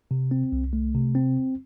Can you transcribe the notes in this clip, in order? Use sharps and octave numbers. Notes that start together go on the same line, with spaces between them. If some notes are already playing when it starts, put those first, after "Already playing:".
C3
C4
C2
A3
C3
C4